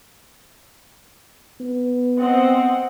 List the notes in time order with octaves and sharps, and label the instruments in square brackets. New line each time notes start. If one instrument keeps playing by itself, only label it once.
[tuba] B3
[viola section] C4 D#5 F#5